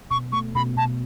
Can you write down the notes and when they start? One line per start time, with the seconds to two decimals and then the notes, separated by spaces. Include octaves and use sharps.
0.11 B2 C#6
0.32 A3 C#6
0.55 B2 B5
0.76 B2 A5